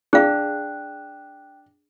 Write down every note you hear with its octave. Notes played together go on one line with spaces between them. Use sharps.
D4 G#4 F5 G5 F#6